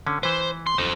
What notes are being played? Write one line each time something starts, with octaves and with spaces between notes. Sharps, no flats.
D3 C#4
E3 B4 C5
C6
D#4 A4 C5